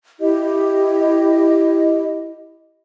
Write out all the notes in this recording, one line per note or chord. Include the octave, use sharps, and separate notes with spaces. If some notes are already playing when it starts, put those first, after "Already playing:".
E4 G4 D#5